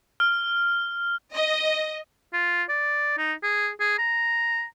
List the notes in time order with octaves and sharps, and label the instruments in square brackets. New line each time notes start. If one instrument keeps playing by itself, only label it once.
[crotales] F6
[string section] D#5
[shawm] F4
D5
D#4
G#4
G#4
A#5